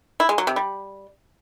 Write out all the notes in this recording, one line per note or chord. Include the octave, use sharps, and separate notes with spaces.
E4
G#3
F#3
C3
G3